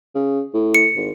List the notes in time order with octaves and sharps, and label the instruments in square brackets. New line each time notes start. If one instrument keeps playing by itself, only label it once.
[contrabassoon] C#3
A2
[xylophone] C#7
[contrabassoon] G#1